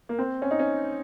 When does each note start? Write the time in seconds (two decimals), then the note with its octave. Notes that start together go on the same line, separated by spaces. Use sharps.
0.09 A#3
0.19 C4
0.42 C#4
0.51 D#4
0.59 C#4